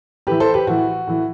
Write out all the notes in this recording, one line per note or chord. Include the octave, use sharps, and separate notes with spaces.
A2 E3 G4 B4
A4 C5
G4 B4
A2 E3 F#4
A2 E3